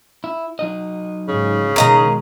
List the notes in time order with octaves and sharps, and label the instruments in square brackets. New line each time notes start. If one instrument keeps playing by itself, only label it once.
[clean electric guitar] E4
F#3 D#4 D#5
[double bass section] G#2 [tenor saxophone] C#3
[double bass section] B2 D#3 G#3 [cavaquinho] A#4 D#5 A#5